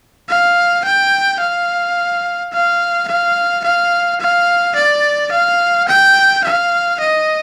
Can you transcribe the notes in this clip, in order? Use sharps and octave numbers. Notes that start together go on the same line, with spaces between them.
F5
G5
F5
F5
F5
F5
F5
D5
F5
G5
F5
D#5